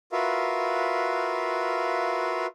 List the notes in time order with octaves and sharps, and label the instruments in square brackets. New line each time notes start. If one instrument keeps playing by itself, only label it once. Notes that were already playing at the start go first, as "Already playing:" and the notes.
[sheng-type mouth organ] F4 F#4 A#4 B4 E5 F5